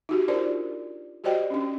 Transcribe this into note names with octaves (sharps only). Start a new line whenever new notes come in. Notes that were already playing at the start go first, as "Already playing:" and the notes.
D#4 F#4 G4
D4 F4 A#4 C5 D5
F#4 G4 C5 D5 D#5 G5
C#4 D4